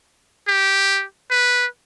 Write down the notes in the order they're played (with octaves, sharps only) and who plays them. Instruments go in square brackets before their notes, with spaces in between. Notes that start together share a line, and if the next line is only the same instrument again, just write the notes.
[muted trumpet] G4
B4